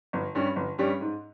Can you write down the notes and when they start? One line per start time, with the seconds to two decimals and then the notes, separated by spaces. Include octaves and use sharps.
0.13 G1
0.35 G2 G3 C#4 G4
0.56 G1
0.78 G2 G3 C#4 G4
1.01 G#2